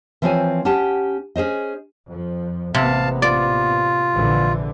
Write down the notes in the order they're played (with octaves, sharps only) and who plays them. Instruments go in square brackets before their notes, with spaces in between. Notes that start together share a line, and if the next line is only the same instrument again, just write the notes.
[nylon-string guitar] E3 F3 C4 C5 C#5 G#5
C#4 G4 F#5 A5
C#4 G#4 C5 D#5
[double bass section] F2 F3
[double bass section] A1 A#3 B3 [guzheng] C3 [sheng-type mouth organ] F5 A5
[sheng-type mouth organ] F4 [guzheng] D5
[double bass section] A#1 D3 E3